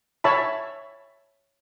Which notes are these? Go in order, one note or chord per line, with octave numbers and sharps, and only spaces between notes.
C#5 E5 A5 B5